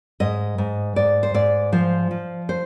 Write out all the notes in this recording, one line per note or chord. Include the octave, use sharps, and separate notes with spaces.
G#2 D#5
G#2
G#2 D5
C5
G#2 D5
F3 C5
F3
C5